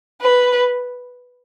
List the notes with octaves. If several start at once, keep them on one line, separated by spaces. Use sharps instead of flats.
B4